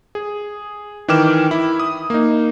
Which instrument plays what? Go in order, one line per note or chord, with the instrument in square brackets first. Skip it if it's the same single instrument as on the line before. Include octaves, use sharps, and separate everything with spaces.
[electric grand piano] G#4
D#3 E3 G5 D6 F6 E7
E4
D#6
A#3 D#4